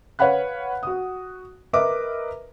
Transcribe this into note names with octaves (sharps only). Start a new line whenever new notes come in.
B4 C#5 F5 F#5 B5 F#6
F#4 D#6
A#4 B4 D#5 E5 D6